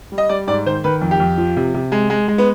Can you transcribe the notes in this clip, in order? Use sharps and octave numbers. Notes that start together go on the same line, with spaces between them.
G3
D#5
G3 D5
G#2 D5
D#3 C5
D#3 B4
F2
G4
F2
F3
C3
C3
G#3
G#3
G#3
B3